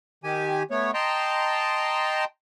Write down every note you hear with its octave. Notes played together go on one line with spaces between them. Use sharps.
D#3 G4 G#5
A3 B3 C#5
D#5 G5 A5 A#5 C6